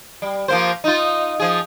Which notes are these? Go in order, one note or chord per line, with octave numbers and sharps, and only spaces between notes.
G3
F3 A#3 C5
D#4 F4
F3 G#4